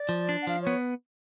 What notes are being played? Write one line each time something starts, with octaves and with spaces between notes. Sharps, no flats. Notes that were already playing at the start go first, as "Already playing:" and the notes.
Already playing: D5
F3
D4
F#5
F3 F5
B3 C#5